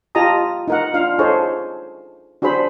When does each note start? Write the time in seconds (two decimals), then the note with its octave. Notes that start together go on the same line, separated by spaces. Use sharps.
0.15 F4 G4 D#5 A5 A#5 D#6
0.68 D#4 A#4 F#5
0.94 D4 F4 F5
1.19 D#4 G#4 A4 C5 C#5
2.42 D4 F#4 G#4 C5 B5